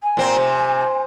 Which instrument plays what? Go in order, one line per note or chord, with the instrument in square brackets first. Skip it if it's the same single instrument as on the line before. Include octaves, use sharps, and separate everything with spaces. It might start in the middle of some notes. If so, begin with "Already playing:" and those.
[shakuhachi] G#5
[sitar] A#2 C4
C3